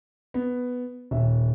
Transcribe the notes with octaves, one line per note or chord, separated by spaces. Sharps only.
B3
D#1 E5